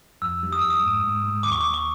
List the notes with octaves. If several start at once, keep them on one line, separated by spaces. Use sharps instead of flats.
F2 E6
G3
D#6
F2 E6
D#6
G#2
G#2
G#2
D#2 D6
C#6
D#2 D6
C#6